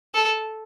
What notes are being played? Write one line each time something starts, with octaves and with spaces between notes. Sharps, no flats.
A4